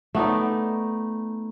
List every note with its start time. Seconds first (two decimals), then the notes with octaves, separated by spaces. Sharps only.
0.15 A3 B3 D#4 D5